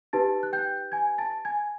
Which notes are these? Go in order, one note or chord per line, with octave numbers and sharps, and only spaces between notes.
D#4 G4 B4 A5 A6
F#6
G5 G6
G#5 G#6
A5 A6
G#5 G#6